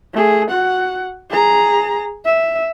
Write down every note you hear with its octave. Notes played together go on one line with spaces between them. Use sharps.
A3 G#4
F#4 F#5
G#4 A#5
E5